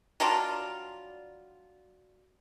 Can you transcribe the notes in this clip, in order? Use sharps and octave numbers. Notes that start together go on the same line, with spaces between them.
F#3 G3 D4 F4